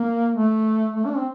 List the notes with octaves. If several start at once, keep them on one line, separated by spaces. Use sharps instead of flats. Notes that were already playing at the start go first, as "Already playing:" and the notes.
Already playing: A#3
A3
A3
D4
C4